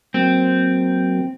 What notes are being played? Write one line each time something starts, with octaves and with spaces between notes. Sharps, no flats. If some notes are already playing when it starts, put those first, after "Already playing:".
F#3 A#3 C4